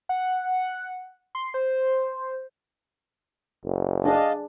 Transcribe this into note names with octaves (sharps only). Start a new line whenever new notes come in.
F#5
C6
C5
F#1
D4 G#4 D5 D#5 F5 A5